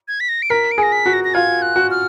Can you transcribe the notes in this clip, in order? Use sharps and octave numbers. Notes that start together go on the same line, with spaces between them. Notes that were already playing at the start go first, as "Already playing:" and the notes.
G#6
B6
A#6
D7
A#4 B6
D7
G#4
A#6
B6
F#4
A#6
A#6
F4 G#6
F#6
F#4
F6